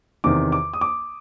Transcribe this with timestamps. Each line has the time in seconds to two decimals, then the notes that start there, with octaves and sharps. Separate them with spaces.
0.24 E2 C3 D#3 D6
0.52 D6
0.74 D#6
0.81 D6